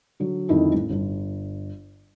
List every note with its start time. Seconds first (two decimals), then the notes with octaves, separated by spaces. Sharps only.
0.20 D3 F#3
0.49 F2 D3 D#3 G3 D#4 E4
0.74 A1
0.90 G1